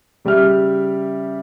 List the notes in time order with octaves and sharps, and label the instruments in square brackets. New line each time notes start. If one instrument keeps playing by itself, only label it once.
[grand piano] C#3 G3 G4 E5 F6